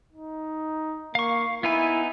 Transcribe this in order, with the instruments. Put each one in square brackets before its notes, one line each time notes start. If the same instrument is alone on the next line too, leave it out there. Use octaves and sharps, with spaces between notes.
[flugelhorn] D#4
[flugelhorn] A#3 [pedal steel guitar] F5 C#6
[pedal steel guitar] B3 D#4 G#5 [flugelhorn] E4